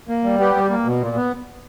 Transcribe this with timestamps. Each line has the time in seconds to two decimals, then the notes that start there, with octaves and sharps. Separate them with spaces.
0.09 A#3
0.24 G3
0.39 B3 G4
0.55 G3
0.70 A#3
0.85 B2
1.00 A#2
1.16 B3